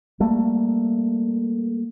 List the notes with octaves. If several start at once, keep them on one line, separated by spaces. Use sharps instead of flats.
G3 A3 A#3